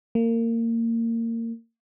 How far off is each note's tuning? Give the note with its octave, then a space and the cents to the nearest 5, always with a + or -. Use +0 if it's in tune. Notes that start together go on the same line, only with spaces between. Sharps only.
A#3 -25